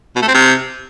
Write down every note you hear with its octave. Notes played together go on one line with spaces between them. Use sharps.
B2
A3
C4
C3